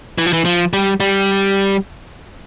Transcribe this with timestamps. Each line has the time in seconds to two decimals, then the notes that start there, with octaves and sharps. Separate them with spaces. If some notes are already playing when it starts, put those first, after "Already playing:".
0.18 E3
0.26 F3
0.33 E3
0.45 F3
0.73 G3
1.00 G3